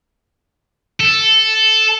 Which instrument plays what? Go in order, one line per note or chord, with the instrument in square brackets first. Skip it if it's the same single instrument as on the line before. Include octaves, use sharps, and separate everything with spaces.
[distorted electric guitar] A4